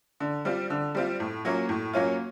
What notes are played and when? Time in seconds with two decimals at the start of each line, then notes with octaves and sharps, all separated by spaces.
0.20 D3
0.45 G3 C4 F4
0.70 D3
0.95 G3 C4 F4
1.20 A2
1.45 F#3 A#3 C#4 F4
1.69 A2
1.93 F#3 A#3 C#4 F4